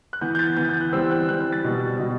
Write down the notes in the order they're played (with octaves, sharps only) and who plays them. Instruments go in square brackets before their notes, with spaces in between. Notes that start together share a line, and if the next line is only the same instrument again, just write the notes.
[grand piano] F#6
E3 B3 G6
G6
A6
E3 B3 G6
G6
F#6
E3 G3 C4 E6
F#6
E3 G3 C4 F#6
F#6
A6
B2 G3 B3
B2 G3